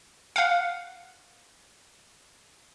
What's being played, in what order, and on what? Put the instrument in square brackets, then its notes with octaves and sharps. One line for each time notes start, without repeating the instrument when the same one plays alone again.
[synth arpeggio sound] F5 F#5